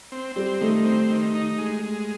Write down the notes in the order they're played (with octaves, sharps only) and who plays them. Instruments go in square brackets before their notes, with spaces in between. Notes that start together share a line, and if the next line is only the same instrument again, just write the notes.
[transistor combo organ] C4
[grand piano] G3 [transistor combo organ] C4
[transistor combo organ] D#3 [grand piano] A3
[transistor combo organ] C4
D#3
D#4
G#3
G#3